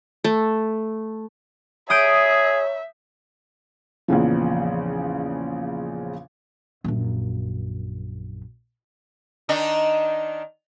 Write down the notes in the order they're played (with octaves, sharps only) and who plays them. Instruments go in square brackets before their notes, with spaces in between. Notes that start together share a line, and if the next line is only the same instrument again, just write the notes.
[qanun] A3
[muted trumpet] G#4 [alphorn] C#5 [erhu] E5 [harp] D#6 G6 D7
[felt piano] A#1 E2 C#3 F3
[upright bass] A#1 F#2
[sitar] D#3 D4 D#4